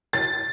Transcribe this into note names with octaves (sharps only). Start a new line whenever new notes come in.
A6